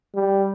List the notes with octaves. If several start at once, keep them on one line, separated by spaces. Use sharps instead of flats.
G3